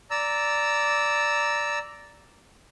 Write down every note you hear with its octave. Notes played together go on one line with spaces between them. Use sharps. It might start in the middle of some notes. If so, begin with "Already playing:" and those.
D5 A#5 E6